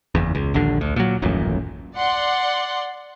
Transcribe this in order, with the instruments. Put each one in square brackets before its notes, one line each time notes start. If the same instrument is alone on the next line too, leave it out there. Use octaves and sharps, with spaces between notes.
[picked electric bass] F#1 E2
C#2
A#1 D#2 D3
D2
A#2 F#3
D#1 A1 F#2 A#2
[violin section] D5 F#5 C6